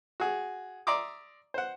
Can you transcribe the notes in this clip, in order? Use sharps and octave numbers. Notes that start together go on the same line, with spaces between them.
F#4 G#4
D5 E5 A#5 C6 D6 D#6
C5 F#5